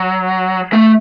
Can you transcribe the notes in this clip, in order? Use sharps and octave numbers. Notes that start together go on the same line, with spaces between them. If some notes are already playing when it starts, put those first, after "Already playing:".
Already playing: F#3
A3